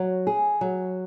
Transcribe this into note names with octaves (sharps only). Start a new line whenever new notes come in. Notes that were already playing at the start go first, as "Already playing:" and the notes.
Already playing: F#3
G#4
F#3